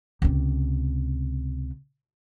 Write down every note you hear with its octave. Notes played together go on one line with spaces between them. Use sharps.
C#2 C3